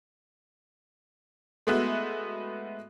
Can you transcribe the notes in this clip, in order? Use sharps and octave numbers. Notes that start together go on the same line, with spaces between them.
G#3 A3 B3 E4 F#4 E5